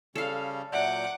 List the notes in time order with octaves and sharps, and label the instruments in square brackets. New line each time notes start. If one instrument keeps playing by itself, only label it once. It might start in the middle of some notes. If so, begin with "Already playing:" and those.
[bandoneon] C#3 G3 C#4 [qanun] A4 F5
[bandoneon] A#2 F#3 G6 [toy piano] D5 E5 [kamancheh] F#5 D6